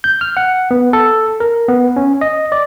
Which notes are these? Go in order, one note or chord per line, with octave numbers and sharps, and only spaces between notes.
G6
F6
F#5
B3
A4
A#4
B3
C#4
D#5
D5